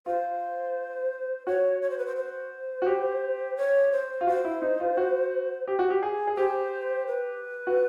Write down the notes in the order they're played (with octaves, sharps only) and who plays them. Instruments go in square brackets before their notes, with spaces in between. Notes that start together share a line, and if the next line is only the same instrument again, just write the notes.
[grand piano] F4 [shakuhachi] C5
[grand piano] F#4 [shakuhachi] C#5
[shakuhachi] C#5
C5
B4
C5
C5
[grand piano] F#4
G4
[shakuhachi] C#5
C5
[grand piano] F4
[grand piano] F#4 [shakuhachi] C5
[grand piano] E4
D#4
F4
F#4
G4
F#4
G4
G#4
G#4
[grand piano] G4 [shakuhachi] C5
[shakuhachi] B4
[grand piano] F#4